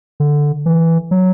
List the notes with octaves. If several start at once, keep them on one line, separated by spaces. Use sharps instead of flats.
D3
E3
F#3